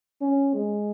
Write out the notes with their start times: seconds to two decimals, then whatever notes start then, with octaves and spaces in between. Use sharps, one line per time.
0.21 C#4
0.54 G#3